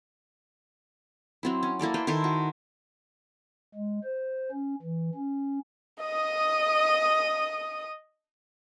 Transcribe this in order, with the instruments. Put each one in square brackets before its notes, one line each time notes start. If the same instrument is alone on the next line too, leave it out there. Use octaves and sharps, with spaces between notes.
[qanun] F#3 C4 E4
C#4
A#3 E4 A4 D5
B4 C5 G5
D#3 E4 A4 C5
F#4
[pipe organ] G#3
C5
C#4
E3
C#4
[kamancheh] D#5 D#6